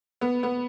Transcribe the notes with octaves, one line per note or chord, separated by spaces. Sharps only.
B3
B3